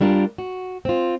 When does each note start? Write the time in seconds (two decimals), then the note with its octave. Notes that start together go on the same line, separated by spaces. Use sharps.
0.01 G3 D4 F4 A#4
0.38 F#4
0.85 C4 F4